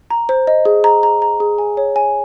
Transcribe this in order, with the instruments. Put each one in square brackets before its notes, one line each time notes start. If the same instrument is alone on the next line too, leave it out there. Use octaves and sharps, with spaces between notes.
[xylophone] A#5
C5
D#5
G#4
A#5
A#5
A#5
G#4
G#5
C#5
G#5